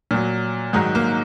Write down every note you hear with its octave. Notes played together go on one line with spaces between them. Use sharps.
A#2 F#3
G#2 D#3 F#3 D#4
A#3